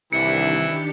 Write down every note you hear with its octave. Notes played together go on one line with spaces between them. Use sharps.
C2 D#3 E3 D4 E4 G4 C#7